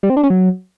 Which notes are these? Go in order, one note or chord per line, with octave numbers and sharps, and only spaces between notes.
G3
C4
D4
C#4
F#3